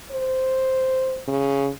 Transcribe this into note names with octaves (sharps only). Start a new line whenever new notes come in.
C5
C#3